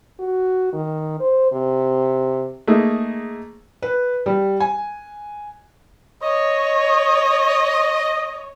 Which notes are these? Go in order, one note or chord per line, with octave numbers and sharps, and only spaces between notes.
F#4
D#3
C5
C3
A3 A#3 D#4 G#4
B4
G3
G#5
C#5 D#5